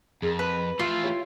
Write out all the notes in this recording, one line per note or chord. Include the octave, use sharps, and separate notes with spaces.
F2 G#4 A#4
B4
E3 A3 F4
E4 G4 C#5